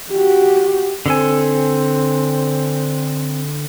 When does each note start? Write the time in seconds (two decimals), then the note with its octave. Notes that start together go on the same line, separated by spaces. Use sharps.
0.11 F#4 G4
1.06 D3 C4 A4 G#5